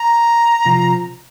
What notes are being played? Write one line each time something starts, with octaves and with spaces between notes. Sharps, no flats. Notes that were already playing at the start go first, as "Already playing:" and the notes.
Already playing: A#5
C3 F3 C4 F4